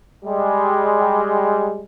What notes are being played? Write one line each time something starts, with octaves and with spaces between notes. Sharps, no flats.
G3 G#3